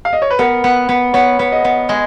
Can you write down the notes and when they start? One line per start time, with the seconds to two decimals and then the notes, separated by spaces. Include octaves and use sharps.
0.05 F5
0.13 D#5
0.22 C#5
0.30 B4
0.39 B3 A#4
0.64 B3
0.89 B3
1.14 B3 C#5
1.39 B3
1.52 D#5
1.64 B3
1.89 G#3 D#5